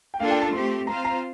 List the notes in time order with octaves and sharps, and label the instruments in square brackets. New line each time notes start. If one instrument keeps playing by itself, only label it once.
[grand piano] G5
[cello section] A#3 D4 F4 A4 [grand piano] F5
[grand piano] G5
A5
[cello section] A3 C4 G4 [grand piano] C6
[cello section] C4 F4 C5 F5 [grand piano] A#5
[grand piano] A#5